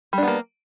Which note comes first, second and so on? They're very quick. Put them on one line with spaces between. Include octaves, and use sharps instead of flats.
G3 D4 B3 A#3